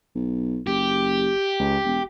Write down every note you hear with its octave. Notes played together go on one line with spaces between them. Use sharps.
B1
F#1 G4
C#2
E1